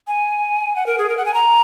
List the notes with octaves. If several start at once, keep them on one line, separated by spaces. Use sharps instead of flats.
G#5
F#5
A#4
G#4
A#4
F#5
G#5
A#5